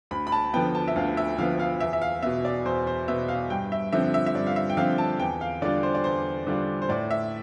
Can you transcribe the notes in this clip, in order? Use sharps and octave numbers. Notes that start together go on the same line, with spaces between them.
D2 B5
B5
A5
D3 F3 B3 G5
A5
E5
D2 F5
E5
D3 F3 B3 F5
F5
E2 E5
E5
F5
B2 B3 E5
D5
E2 C5
C5
B2 B3 E5
F5
G2 G5
E5
D3 F3 C4 E5
E5
E5
G2 D5
F5
E5
G5
D3 F3 C4 F5
A5
E2 G5
F5
D3 G3 D4 F4 D5
C5
D5
E2 C5
D3 G3 D4 F4
C5
A2 D5
E5